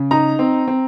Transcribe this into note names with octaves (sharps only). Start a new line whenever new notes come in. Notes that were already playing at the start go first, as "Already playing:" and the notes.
Already playing: C#3
D#4 A#5
C4
C4